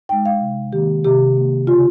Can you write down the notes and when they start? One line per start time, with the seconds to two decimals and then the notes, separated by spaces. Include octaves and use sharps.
0.09 G#3 D#4 G5
0.26 F5
0.41 C3
0.73 D#3 A#3 G4
1.05 C3 G4
1.37 D#3 A#3
1.67 C#3 F4